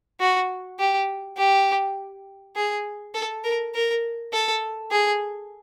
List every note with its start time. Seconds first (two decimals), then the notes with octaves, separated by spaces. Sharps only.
0.20 F#4
0.79 G4
1.38 G4
2.56 G#4
3.14 A4
3.44 A#4
3.75 A#4
4.33 A4
4.91 G#4